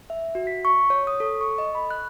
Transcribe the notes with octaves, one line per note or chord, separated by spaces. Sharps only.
E5
F#4
B6
C#6
C#5
D#6
A4
C#6
D#5
B5
F#6